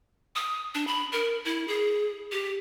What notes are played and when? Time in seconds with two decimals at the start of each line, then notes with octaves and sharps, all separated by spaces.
0.36 D#6
0.75 D4
0.87 B5
1.12 A#4
1.45 E4
1.68 G#4
2.32 G4